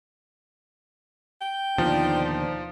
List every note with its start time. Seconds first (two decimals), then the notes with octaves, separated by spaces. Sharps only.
1.41 G5
1.78 D#2 B2 D3 F3 D#4 C5 D5